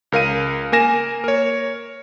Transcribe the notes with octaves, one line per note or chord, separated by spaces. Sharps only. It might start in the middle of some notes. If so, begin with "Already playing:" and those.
C#2 A#4 F5 D#7
A#3 A#4 G#5 A#6 E7
A#4 C#5